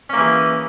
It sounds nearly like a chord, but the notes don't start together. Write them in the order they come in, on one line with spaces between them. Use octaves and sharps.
C#4 A#3 E3 G#4